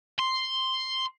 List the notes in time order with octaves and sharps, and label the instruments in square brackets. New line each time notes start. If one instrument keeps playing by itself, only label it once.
[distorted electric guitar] C6